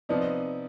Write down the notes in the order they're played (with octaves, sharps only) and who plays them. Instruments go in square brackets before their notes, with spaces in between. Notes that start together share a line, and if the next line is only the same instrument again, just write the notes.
[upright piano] C3 F3 B3 D#4 [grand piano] D5